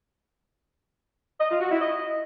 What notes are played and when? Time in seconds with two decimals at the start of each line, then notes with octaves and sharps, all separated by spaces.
1.40 D#5
1.50 F4
1.60 F#4
1.71 E4
1.81 D#5